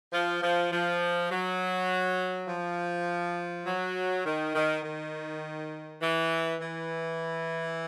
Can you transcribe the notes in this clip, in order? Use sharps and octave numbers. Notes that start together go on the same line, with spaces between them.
F3
F3
F3
F#3
F3
F#3
D#3
D#3
D#3
E3
E3